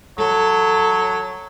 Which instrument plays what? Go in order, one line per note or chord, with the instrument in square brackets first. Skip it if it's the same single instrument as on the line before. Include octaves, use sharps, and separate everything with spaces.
[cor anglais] F#3 [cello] A4